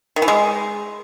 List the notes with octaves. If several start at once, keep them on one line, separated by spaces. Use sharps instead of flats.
D#3
E3
G#3